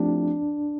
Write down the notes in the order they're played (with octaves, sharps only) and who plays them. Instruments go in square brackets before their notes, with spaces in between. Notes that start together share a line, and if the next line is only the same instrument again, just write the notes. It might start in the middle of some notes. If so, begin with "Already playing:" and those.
Already playing: [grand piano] F3 A3 C4 E4 G4 [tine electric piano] D4